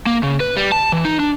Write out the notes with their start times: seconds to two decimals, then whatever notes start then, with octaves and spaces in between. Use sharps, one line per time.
0.06 A#3
0.23 C#3
0.40 B4
0.57 G3
0.72 A5
0.92 E3
1.05 D#4
1.20 D4